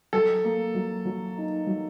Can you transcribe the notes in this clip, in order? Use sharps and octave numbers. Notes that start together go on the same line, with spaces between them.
F#3 A4
A#3
F#3
F#3
D#4
F#3